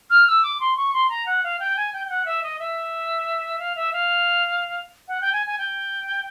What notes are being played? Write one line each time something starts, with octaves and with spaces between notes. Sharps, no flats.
F6
E6
D6
C6
C#6
C6
A#5
F#5
F5
G5
G#5
G5
G5
F#5
E5
D#5
E5
F5
E5
F5
F#5
G5
G#5
G#5
G5